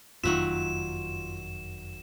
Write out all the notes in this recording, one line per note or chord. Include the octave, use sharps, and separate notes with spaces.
F#1 F2 D#3 F#3 A3 F4 E5 E7